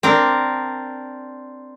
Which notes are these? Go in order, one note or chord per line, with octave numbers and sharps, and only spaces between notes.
C4 D4 A#4